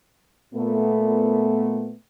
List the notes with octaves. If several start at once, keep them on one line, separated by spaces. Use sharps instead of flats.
A#2 A3 B3